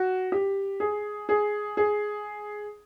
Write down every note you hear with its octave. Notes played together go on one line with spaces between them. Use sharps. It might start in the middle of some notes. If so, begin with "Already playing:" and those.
Already playing: F#4
G4
G#4
G#4
G#4